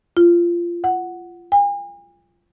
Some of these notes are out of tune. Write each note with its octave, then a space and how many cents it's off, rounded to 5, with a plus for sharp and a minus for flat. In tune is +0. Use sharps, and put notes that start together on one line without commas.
F4 -20
F#5 +0
G#5 -45